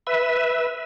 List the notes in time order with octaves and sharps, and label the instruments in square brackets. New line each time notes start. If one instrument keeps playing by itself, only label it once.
[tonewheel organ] B4 E5